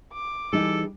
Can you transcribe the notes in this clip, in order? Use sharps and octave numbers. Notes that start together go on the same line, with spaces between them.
D6
E3 G3 D#4 G#4 A4